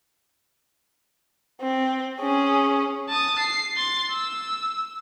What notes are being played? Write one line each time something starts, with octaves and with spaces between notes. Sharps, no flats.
C4
C#4 G#4
A5 D#6
C7
C6 A6
E6